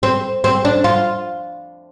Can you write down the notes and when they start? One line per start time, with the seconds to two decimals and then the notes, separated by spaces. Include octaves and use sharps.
0.03 C4
0.44 C4
0.65 D4
0.84 F4